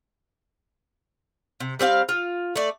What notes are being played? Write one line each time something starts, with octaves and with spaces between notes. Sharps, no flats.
C3
G3 C4 E5 F5
F4
A3 D5